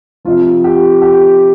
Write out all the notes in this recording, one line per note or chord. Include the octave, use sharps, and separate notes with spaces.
C3 F3 F4
G4
G4